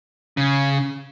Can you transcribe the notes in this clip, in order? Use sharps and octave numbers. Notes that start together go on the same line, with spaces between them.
C#3